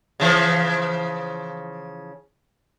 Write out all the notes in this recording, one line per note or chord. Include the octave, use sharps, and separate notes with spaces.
C#3 E3 F3